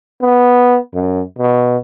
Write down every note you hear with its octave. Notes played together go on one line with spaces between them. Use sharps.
B3
F#2
B2